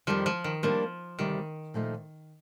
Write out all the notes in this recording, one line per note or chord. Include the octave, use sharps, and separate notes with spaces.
F2 D#3 F3 G3
F3
D#3
F3 G3 A#3 D4
D2 C3 D#3 G3
A#2 F3 A3 D#4